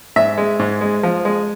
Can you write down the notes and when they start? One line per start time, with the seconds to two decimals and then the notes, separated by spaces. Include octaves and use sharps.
0.16 G#2 E5
0.38 G#3
0.59 G#2
0.81 G#3
1.03 F3
1.25 G#3